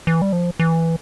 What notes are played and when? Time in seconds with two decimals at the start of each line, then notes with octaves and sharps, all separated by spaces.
0.07 E3
0.22 G3
0.32 F3
0.60 E3